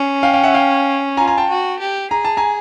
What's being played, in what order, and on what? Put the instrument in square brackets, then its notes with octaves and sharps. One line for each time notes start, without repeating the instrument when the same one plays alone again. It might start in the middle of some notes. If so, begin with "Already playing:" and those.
Already playing: [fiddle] C#4
[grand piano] F5 G5
F5 G5
E5 F#5
F5 G5
[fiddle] F4 [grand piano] G#5 A#5
[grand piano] G#5 A#5
G5 A5
[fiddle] F#4
G4
[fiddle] G#4 [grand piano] A#5
[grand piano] A5
G#5 A#5